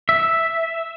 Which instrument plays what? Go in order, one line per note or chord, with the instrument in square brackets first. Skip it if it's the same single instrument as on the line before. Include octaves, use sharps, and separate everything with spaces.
[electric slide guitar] E5